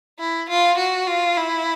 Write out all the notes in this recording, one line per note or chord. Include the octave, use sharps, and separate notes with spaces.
E4
F4
F#4
F4
E4